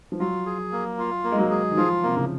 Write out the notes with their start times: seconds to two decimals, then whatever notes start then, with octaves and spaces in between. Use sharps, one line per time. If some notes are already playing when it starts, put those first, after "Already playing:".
0.12 F3
0.20 F#3 F4
0.46 G#4
0.72 A#3
0.99 F4
1.24 A#3
1.31 G#3
1.38 F#3
1.50 G#4
1.71 D#3
1.77 F3 F4
2.03 C3 A#3
2.17 C#3